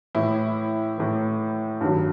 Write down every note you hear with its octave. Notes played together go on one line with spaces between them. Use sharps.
A2 E3 E4
A2 E3
G2 D#3 F#3